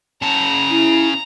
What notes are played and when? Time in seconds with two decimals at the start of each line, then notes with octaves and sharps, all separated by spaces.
0.22 C#3 A5 A#5
0.70 E4